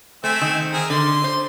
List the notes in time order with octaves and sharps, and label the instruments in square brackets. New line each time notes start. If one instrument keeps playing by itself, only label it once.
[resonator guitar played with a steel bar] A3 [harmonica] C4 E5 G#5
[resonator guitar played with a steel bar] D#3
[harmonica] C4 G#4 A#4
[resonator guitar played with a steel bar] D3 [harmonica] C6
[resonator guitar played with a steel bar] C5